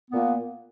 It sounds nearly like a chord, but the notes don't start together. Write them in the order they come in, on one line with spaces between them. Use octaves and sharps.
B3 A#2 A#3